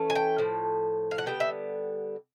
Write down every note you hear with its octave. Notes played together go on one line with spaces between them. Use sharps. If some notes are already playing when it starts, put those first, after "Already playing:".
Already playing: E3 A3 C#4
G#5
G5
A2 F3
F5
F#5
D3 G3 B3 G5
E5